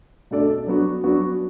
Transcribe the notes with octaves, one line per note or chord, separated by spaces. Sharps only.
B2 A3 D4 A4 D5
F#3 B3 D4 F#4
F#3 B3 D4 F#4